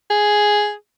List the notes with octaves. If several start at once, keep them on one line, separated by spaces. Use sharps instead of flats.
G#4